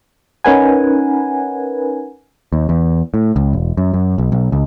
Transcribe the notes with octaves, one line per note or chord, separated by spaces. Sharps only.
C#4 D#4 A#4 B4 F#5 G#5
D#2
E2
A2
C#2
E1
F#2
F#2
B1
B1
C#2